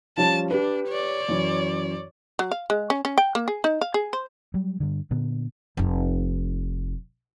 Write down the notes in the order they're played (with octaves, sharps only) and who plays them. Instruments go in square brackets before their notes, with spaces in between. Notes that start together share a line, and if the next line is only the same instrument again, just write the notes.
[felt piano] F3 G3 C#4 [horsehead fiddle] A5
[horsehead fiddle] D4 [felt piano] G4 B4
[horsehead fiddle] C#5 D5
[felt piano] F#2 E3
[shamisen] F#3
F5
G#3
C#4
C#4
G5
A#3
G#4
D#4
F5
G#4
C5
[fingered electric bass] F#3 G3
G2 D3
A#2 D3 B3
[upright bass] F1 D#4